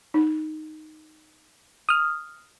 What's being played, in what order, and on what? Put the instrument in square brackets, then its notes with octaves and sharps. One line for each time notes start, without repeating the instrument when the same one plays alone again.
[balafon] D#4
[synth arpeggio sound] D#6 F6